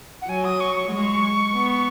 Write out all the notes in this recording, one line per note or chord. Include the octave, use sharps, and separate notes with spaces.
F#5
F#3 G#5
D#6
C#6
C#6
G#3
B3